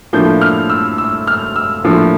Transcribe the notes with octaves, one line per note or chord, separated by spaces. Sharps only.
A2 F3 A#3 D4 G6
F6
E6
E6
F6
E6
A2 F3 A#3 D4